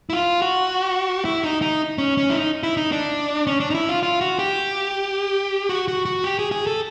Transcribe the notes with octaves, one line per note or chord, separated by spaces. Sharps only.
E4
F4
F#4
E4
D#4
D#4
C#4
C#4
E4
D#4
E4
D#4
D4
C#4
D4
D#4
E4
F4
F4
F#4
G4
F#4
F#4
F#4
G4
G#4
G#4
A4